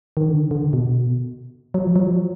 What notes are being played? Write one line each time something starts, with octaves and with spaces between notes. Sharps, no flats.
D#3
D3
D3
B2
F#3
F3
F#3
F3